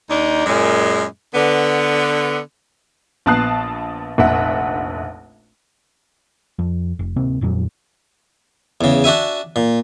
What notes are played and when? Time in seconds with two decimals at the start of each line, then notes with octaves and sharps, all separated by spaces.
0.10 D#2 D4 D#4
0.46 F#2 A#2 G#3
1.34 D3 B3
3.26 A#1 B3 A5 D#6 F#6 C7
4.18 F1 A#1 E5 F#5
6.59 F2
6.99 F1
7.16 D1 C3 A#3 C4
7.41 F1 F2 A#2 F#3
8.81 E2 C#3
9.04 D4 F#4 E5 G#5
9.56 A#2